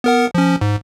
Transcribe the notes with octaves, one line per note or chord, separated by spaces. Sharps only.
B3 A#4 F#5
F3 C#4
G#2